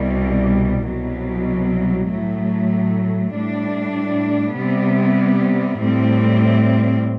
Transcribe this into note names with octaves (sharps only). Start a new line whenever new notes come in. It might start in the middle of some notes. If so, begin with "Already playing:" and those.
Already playing: C2 B2 G3
C2 B2 F#3
A2 F#3 A3
A2 G3 D4
C3 G3 B3
A2 G3 C4